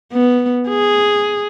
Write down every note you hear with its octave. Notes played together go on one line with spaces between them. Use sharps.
B3
G#4